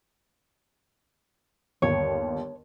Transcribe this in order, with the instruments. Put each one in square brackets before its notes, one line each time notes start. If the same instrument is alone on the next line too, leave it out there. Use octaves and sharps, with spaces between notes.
[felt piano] G1 D#2 [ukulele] C#5